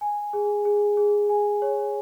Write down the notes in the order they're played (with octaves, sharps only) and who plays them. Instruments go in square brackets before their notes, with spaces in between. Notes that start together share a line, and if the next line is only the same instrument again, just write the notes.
[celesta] G#5
G#4
G#4
G#4
G#5
C#5